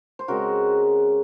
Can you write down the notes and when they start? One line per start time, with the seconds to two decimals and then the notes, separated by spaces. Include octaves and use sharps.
0.19 C5
0.28 C#3 G#3 C4 F#4 A#4